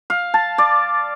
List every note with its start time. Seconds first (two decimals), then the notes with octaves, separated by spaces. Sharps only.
0.10 F5
0.34 A5
0.58 D5